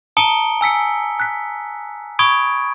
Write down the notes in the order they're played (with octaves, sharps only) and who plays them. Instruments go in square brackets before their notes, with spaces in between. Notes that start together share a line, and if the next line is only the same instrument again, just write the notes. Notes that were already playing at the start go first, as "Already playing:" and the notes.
[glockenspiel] A5 A#5 D#6 C#7 D7 G7
G#5 E6 B6 C#7
F#6 B6
B5 C#6 D#6 G#6 D7